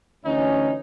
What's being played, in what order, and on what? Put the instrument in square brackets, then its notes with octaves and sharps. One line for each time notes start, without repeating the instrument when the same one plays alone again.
[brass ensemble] D2 E3 C#4 [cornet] D#4